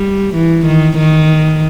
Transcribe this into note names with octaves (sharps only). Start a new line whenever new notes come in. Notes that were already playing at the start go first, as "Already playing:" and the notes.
Already playing: G3
E3
D#3
D#3